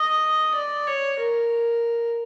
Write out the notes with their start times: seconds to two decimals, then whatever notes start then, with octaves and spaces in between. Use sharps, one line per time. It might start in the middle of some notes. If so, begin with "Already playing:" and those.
Already playing: D#5
0.54 D5
0.87 C#5
1.20 A#4